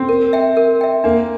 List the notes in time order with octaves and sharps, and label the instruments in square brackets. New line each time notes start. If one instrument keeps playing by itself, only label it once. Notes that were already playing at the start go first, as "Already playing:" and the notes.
Already playing: [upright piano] C4
[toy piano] A#4
E5 G5
A#4
E5 G5
[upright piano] A#3 [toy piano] D4